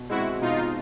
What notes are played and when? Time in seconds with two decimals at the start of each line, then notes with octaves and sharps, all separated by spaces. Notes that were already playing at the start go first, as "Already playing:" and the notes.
Already playing: B2
0.10 G#3 C4 E4 F#4
0.41 B2 D#4 F4